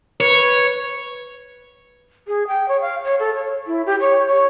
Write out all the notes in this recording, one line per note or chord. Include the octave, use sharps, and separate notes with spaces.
B4 C#5
G#4
G5
C#5
F5
C#5
A4
C#5
E4
G4
C#5
C#5